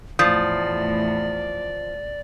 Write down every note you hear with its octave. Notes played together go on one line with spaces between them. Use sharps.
E2 A2 F3 D5 D#6 G6